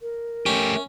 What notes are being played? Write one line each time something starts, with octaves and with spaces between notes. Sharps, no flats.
A#4
A3 C#4 G4